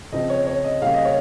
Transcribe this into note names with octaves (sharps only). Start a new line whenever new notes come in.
C#3 F3 C4 D#5
C#5
C#5
D#5
C#3 G3 A#3 C#4 F5
D#5
C#5